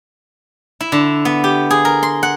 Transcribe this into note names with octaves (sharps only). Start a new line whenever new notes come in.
E4
D3
B3
G4
G#4
A#4
C6
F#5